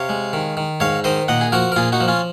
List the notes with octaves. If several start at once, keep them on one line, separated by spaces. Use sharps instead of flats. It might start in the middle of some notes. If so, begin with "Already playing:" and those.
Already playing: C3 C#5 F5
G#3
D#3
D#3
G#2 C#5 F5
D#3 C5 D#5
A#2 D#5 F#5
G#4
F3 F#4 A#4
A#4
A#2 F4 G#4
D#4 F#4
F3
C#4 F4